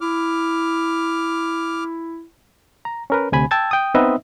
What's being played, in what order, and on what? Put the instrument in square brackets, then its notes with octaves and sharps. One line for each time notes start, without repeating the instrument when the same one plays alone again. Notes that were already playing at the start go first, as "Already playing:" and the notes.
[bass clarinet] E4 [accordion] D6 F6
[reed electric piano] A#5
C#4 A#4 B4
D2 C3 G#5 B5
G5 A5 E6 G#6 A6
G5 D#6
B3 C4 D#4 B4 D#5 E5